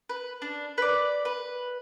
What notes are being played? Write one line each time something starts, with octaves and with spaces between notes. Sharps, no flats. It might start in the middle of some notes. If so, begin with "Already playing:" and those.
B4
D4
B4 D5
B4